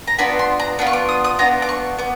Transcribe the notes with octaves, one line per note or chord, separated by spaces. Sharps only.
A#5
B3 D4 F4 B5
C6
A#5
B3 D4 F4 B5
C#6
D6
D#6
D#6
B3 D4 F4 A#5
D6
C#6
B3 D6